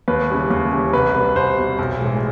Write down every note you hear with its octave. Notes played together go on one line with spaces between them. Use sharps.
D#2 B4
C#3 E3 G3
D#2
C#3 E3 G3
C2 B4
B2 G3 B4
C2 C5
B2 G3
B1
A2 E3 G#3